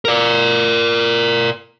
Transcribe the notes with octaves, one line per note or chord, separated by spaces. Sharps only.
A#4 D5